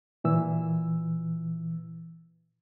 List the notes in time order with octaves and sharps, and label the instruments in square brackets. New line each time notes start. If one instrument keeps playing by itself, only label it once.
[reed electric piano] A#2 E3 E6